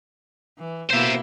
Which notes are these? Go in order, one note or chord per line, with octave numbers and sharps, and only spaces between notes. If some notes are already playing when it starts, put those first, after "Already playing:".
E3
B2 A#3 E4 C5 E5